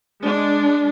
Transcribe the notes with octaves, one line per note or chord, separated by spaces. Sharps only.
G#3 D4